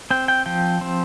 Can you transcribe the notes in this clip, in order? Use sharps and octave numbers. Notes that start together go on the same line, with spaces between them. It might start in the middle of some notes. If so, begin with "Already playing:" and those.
C4 G5
G5
F3 G5
C4